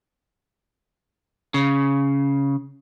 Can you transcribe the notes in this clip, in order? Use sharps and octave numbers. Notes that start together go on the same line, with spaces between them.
C#3